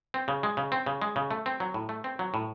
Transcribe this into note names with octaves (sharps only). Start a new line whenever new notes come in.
C4
C#3
G#3
C#3
C4
C#3
G#3
C#3
A3
C4
F#3
A2
A3
C4
F#3
A2